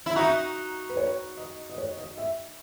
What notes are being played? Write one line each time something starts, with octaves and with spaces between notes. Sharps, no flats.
E4
D#4 F#4 E5
B4
C#5
D#5
D#5
C#5
D#5
E5